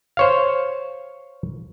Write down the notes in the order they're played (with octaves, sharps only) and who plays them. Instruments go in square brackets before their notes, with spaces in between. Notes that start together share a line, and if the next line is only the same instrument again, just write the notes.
[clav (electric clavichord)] C5 C#5 F5